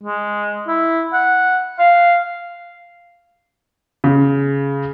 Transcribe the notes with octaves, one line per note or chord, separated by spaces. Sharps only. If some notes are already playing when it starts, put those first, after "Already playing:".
G#3
E4
F#5
F5
C#3